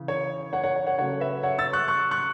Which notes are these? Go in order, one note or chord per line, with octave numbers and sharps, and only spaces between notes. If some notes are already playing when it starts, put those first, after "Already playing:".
Already playing: C#3 E3
C#5
C#5 F#5
C#5 F#5
C#5
C#5 F#5
C#3 F#3 A3 C#5 F#5
B4 E5
C#5 F#5
E6 A6
C#6 F#6
C#6 F#6
C#6 F#6